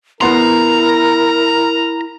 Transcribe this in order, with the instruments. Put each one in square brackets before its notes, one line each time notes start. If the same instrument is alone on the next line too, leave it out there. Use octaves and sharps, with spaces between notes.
[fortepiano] E2 B3 C6 [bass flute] E4 [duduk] A#4 [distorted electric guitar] A#5